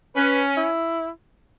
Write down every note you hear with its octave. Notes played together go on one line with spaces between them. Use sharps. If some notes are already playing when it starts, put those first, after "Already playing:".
C#4 B4
E4